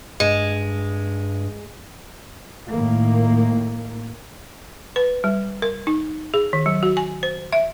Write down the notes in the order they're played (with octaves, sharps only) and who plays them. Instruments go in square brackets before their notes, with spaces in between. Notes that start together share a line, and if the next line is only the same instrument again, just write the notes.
[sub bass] G2 [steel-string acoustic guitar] G#3
[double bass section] A2 D#3 A#3
[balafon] B4
G3
A#4
D#4
G#4
D#3
F#3
F#4
G#5
C5
E5